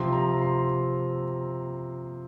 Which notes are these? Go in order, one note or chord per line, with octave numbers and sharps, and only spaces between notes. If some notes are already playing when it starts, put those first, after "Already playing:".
Already playing: C3 F3 C4 C6
A#5
C6